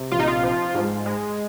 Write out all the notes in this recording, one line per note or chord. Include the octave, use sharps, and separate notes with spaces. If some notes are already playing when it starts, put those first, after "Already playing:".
Already playing: C3
A#1 F4
D#4
F4
F3
G#2
G#3